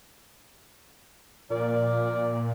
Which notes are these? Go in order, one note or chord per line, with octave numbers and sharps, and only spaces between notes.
A#2 F3 A#4 D5